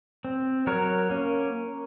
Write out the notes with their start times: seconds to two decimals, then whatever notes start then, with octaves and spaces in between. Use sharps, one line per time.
0.25 C4
0.67 F#3 A#4 C#5
1.10 A#3 C#4